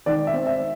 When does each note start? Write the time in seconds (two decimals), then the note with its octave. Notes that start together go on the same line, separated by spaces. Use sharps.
0.06 D#3 D5
0.27 E5
0.34 C4
0.47 E5